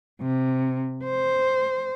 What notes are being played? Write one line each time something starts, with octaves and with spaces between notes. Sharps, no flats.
C3
C5